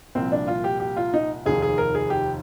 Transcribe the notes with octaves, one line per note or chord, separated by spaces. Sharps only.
C2 A#2 F3 C4
D4
F4
G4
G4
F4
D#4
F1 D#2 D#3 G#4
G#4
A#4
G#4
G4